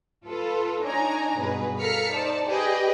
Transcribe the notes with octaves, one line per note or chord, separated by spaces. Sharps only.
F4 A4 B4
D4 D#4 C#5 G#5 A#5
G2 B2 G#4 B4
A4 A#4 F5 F6 B6 C#7
D#4 C5 D5 A5
G4 G#4 B4 D5 D#5 G5